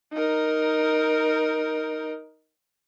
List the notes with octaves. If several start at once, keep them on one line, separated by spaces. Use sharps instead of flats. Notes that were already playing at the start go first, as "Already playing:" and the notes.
D#4 A#4